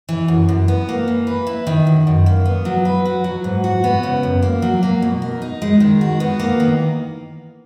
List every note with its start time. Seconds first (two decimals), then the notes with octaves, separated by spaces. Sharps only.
0.09 E3
0.28 F#2
0.49 F#2
0.68 B3
0.89 A#3
1.08 E3
1.27 B4
1.47 E4
1.67 D#3
1.87 F#2
2.07 F#2
2.26 A#3
2.46 B3
2.65 F#3
2.85 B4
3.05 F#4
3.24 F#3
3.44 G#2
3.64 F#4
3.84 B3
4.03 C#3
4.23 F#2
4.42 A#3
4.62 F#3
4.83 A#3
5.02 B2
5.22 A#4
5.42 D#4
5.62 G#3
5.80 D#3
6.01 F#4
6.20 B3
6.40 A#3
6.60 D#3